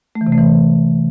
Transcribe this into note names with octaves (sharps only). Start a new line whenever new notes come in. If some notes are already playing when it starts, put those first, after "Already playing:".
A3
E3
C3
A3
E3